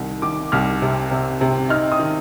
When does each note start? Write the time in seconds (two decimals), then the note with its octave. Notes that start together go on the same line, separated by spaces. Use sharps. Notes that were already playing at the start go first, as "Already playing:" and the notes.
Already playing: C2 D#3
0.22 D#3 D6
0.52 C2 F6
0.82 C3
1.11 C3
1.41 C3
1.69 D#4 F6
1.91 D#6
1.99 D#3